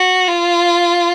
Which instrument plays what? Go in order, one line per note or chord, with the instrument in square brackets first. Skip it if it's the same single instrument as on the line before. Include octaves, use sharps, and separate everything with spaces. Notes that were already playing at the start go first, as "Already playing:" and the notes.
Already playing: [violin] F#4
F4